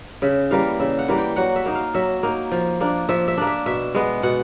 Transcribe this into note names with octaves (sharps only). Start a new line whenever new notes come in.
C#3 E5
E3 G3 A#3 F5
C#3 E5
F#5
E3 G3 A#3
G5
F#3 F#5
E5
A#3 D#4
F5
F#3 E5
A#3 D#4
F3
A#3 D4
F3 E5
E5
A#3 D4
E5
B2 E5
G#3 B3
B2 F#5